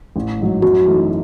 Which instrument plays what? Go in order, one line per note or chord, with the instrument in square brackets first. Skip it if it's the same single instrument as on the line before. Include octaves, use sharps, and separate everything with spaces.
[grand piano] A1
G#2 F#3
[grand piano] F#2 [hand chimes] F#4
[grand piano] E3 A3 D#4